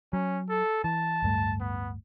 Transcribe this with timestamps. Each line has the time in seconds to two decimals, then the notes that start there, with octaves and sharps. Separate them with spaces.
0.13 F#3 C#4
0.50 A4
0.84 E3 A5
1.22 D1 G2 A3
1.60 B3